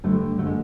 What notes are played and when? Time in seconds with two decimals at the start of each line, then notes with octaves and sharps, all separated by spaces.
0.04 G2 D3 A3
0.38 D3 A3
0.47 G#3